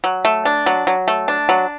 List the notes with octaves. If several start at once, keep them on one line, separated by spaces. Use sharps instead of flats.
F#3
A3
D4
F#3
F#3
A3
D4
F#3